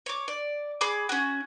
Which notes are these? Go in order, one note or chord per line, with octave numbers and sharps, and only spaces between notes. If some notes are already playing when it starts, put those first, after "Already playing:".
C#5 D6
D5
G#4 B5 D6
C#4 F#4